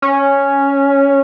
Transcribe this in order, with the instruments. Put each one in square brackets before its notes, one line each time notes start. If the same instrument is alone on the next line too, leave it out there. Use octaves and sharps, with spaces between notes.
[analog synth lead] C#4